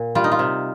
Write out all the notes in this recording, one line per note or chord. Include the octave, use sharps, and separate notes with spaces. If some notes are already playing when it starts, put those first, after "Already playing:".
Already playing: A#2
G3 F4
D#4
F4
C3